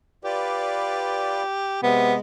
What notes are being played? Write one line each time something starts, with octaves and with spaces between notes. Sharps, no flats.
F4 G4 B4 D5
C3 G#3 B3